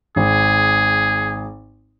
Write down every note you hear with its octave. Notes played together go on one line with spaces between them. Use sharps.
G#1 G#4